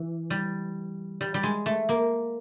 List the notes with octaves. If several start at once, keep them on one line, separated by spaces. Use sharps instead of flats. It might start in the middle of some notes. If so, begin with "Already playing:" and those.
Already playing: E3
G3
G3
G3
G#3
A3
A#3